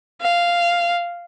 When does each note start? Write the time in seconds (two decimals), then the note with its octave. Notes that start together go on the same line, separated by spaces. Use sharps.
0.21 F5